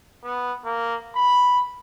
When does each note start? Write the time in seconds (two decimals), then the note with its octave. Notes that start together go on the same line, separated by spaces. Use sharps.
0.24 B3
0.65 A#3
1.15 B5